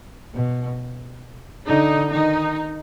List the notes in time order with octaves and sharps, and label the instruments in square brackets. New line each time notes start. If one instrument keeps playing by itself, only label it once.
[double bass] B2
[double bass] D3 [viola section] D#4
[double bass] D#3 [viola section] D#4